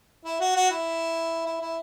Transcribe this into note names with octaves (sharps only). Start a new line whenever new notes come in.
E4
F#4
F#4
E4
E4
E4